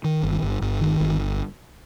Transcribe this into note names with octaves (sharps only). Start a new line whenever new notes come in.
D#3
G1
G1
G1
D#3
G1